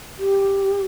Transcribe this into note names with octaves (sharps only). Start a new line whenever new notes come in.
G4